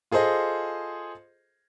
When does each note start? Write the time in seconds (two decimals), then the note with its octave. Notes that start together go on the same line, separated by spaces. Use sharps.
0.11 F4 G#4 A4 C5 D#5